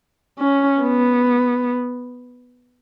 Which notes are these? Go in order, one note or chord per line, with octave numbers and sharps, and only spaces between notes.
C#4
B3